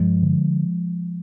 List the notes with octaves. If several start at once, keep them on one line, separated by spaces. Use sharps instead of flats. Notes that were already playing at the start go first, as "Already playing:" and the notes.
Already playing: G2 F3 G#3
D3